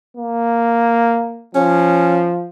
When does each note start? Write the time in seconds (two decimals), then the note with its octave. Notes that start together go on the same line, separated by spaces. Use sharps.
0.17 A#3
1.55 F3 C#4